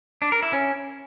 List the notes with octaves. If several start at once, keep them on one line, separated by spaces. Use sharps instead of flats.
D4
A#4
E4
C#4